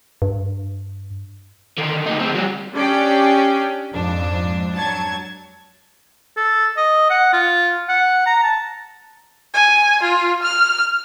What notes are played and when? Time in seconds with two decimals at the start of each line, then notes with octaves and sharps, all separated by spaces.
0.22 G2
1.78 D3 D#3
2.06 D2 D#4
2.19 D3 C4
2.35 G3 F#4
2.75 C#4 D4 G4 G#4 D5 G5
3.93 F2 G#2 F3 D4
4.75 F#3 A5 G#6
6.37 A4
6.77 D#5
7.10 F#5
7.33 F4
7.89 F#5
8.26 A#5
8.43 A5
9.54 G#5
10.02 F4
10.42 F6